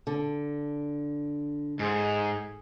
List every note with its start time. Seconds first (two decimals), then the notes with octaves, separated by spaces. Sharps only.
0.07 D3
1.79 G#2 G#4